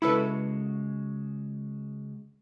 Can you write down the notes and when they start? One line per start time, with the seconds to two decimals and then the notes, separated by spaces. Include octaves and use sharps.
0.02 C#3 G#3 E4 F#4 A4 B4